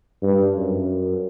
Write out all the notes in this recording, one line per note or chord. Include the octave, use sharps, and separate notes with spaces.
G2
F#2